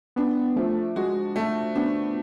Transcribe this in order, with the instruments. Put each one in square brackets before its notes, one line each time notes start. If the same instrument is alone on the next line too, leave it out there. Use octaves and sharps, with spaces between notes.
[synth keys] B3 [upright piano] D4
[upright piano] F3 [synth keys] A3
[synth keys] G#3 [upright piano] F#4
[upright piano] A3
[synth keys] B3 [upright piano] D4